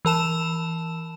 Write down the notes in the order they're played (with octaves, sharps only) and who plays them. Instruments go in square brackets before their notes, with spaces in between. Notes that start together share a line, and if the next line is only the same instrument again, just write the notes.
[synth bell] E3 A#4 A5 E7